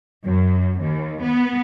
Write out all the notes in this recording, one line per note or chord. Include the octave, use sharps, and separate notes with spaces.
F#2
D#2
B3